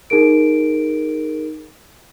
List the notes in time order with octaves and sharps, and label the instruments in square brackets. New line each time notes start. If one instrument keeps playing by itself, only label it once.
[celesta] D#4 G#4 A#4 D7